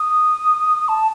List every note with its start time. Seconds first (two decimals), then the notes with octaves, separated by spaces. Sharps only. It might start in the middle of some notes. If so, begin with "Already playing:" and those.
Already playing: D#6
0.88 A5